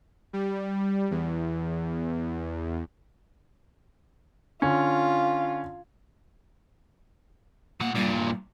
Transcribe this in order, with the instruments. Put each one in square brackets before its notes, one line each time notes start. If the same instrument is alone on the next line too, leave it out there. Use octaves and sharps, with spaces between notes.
[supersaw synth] G3
E2
[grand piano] D3 C#4 [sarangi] F4
[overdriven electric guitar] A#2 F#5 [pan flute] A#3
[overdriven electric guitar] G2 A#2 [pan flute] G3